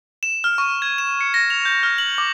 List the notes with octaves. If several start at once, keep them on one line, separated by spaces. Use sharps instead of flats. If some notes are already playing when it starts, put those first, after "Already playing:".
E7
F6
C#6
G#6
E7
C#7
A#6
F7
G6
F6
F#7
D6